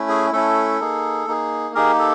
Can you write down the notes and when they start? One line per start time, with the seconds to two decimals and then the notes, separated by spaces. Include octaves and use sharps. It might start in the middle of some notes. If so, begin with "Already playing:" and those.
Already playing: A3 C#4 E4
0.09 G#4
0.33 A3 C#4 E4 A4
0.80 A#3 D#4 G#4
1.27 A#3 D#4 G#4
1.75 A#3 D#4 G4 G#4 A#4
1.99 A4